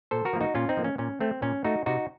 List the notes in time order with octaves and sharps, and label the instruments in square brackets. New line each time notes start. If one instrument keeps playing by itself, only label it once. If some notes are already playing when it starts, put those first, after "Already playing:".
[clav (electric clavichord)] A#2 A4 C5
F#4 A#4
F3 A#3
D#4 F#4
A#2 C#4 F4
C4 D#4
F3 A#3
C#4
A#2 C#4
A3 C4
A#2 C#4
A3 D#4 F#4
C3 D#4 F#4